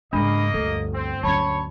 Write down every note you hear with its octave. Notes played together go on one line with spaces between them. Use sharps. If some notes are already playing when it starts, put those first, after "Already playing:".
G#2 C#3 G#3 A#3 D4 D#5 B5
G1 D2 A4
C4
D2 F#3 C#4 C#5 A5 B5